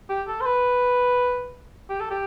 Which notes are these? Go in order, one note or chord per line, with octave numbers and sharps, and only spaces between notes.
G4
A4
C5
B4
G4
A4
G4